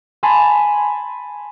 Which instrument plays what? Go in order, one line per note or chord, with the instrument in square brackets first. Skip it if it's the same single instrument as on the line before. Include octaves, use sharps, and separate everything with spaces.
[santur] G#5 A5 B5 C6